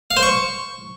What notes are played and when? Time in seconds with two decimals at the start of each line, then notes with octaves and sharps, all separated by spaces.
0.11 F5
0.17 C5
0.23 C#6